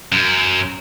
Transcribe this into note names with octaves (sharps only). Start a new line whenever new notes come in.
F#2